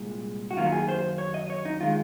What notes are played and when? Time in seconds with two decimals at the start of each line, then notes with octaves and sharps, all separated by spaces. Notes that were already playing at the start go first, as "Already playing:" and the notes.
Already playing: C2 A#2 G#3
0.51 F#4
0.57 F#2 D#3 F#3 A#3 F4
0.72 G#4
0.89 C5
1.18 C#5
1.34 D#5
1.50 C#5
1.65 D#4
1.80 D#3 G#3 F4